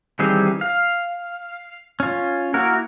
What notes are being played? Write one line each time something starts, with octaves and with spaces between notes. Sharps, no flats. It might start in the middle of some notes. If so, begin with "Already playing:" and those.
D#3 E3 G3 C4 G#4
F5
C#4 F4
A#3 E4 F#4 A#4